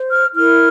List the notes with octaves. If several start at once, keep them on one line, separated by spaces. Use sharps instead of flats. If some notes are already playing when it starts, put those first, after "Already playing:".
Already playing: C5
F6
E4 A#4 F6